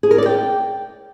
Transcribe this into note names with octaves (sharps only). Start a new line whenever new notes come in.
G#4
A#4
D5
G5